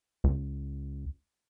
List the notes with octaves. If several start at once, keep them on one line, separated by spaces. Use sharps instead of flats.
C#2